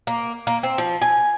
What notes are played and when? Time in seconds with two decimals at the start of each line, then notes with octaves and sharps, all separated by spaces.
0.07 A#3
0.47 A#3
0.63 C4
0.78 F3
1.02 G#5